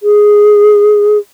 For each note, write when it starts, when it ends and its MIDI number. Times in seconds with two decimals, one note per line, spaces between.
0.03 1.18 68